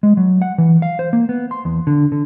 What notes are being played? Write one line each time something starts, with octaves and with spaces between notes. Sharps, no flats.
G#3
F#3
F#5
E3
F5
C5
A#3
B3
C6
E2
D3
D3